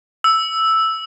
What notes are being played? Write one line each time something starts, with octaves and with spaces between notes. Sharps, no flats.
E6